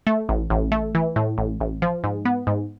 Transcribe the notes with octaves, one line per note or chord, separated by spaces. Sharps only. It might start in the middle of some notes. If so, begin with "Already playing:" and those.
A3
A1
A1
A3
E3
A2
A1
A1
F3
G#2
B3
G#2